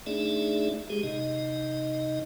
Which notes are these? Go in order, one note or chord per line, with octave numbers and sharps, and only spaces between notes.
A3 D4 D#4 G#4 D5 E5
G#3 G4 G#4
C3 D#4 D#5